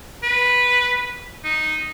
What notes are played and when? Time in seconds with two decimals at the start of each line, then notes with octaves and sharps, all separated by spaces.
0.23 B4
1.44 D#4